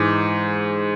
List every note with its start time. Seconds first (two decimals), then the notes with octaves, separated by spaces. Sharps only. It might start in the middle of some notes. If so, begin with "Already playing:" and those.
Already playing: G#2 E3 G#3 D6